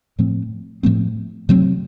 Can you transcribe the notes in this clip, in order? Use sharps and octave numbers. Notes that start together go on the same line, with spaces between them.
A2 F3 A3 C4
A2 F3 A3 C4
C3 F#3 A3 C4